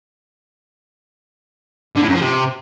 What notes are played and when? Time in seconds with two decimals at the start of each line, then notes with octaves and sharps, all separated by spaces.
1.96 D3
2.02 A2
2.08 F#2
2.15 F3
2.21 C3